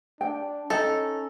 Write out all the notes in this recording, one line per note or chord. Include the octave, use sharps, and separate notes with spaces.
D4 G5
C#4 D#4 A4